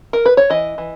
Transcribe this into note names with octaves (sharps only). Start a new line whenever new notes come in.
A#4
B4
C#5
E3 D#5
E3